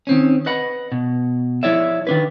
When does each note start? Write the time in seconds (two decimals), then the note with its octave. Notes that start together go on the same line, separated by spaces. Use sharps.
0.07 D#3 C4 C#4
0.46 B4 D#5 F#5 B5
0.92 B2
1.63 F3 E4 C#5 D5 E5
2.07 D#3 D4 B4